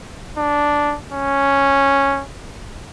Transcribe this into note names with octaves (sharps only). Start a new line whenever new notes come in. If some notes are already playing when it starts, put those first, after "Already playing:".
D4
C#4